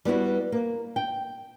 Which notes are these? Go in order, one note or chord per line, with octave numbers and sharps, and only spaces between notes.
G3 B3 E4 F#4
A#3
G5